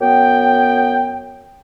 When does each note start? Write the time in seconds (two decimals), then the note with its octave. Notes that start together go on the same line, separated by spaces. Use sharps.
0.01 F#2 B3 G5